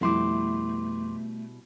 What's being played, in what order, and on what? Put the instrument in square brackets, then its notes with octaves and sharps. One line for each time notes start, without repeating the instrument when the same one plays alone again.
[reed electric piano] F2 C6 D6 [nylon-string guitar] B2 G3 E4 [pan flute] A3